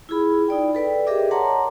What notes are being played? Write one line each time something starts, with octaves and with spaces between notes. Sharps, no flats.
E4 F4 G#4 B5
D#4 D5 G5
A4 B4 D5 G5
G4 G#4 A#4 D#5 E5 D6
A#4 C#5 F#5 A5 A#5 C6